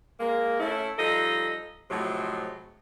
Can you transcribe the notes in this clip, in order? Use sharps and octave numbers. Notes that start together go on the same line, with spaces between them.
G#3 A#3
A3 C#4 E4
F3 G3 D#4 A4 D#5
A2 C3 F3 F#3 G#3